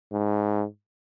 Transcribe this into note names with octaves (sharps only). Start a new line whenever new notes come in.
G#2